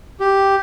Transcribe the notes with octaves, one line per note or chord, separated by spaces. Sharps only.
G4